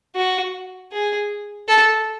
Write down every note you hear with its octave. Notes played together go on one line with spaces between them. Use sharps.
F#4
G#4
A4